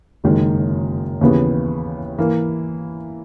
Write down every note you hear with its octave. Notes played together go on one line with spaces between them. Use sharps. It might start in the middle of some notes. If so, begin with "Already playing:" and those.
F#1 F#2 D#3 G#3
D#2 C#3 E3 B3
E3 A#3